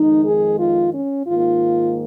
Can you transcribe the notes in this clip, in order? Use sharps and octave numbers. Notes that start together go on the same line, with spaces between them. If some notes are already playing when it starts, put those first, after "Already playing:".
Already playing: F2 D#3 G#3 D#4
G#4
F4
C#4
G#2 D#3 A#3 F4